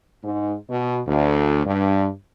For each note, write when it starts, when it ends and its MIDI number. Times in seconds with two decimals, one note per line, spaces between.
0.24 0.55 44
0.70 1.01 47
1.08 1.63 38
1.66 2.08 43